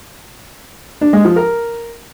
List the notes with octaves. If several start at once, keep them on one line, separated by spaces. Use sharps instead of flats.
D4
G#3
F3
A#4